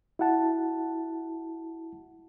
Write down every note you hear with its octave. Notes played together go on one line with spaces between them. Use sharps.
E4 F#4 F#5 A5